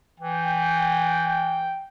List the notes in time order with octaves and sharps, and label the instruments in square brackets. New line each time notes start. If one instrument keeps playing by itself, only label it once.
[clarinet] E3 [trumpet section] G5